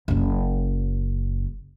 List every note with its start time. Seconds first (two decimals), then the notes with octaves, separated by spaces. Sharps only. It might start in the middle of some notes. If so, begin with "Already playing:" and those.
0.08 F#1 C#3